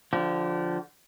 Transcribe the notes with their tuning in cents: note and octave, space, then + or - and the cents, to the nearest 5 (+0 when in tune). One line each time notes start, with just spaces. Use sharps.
D3 +0 F3 +0 G4 -35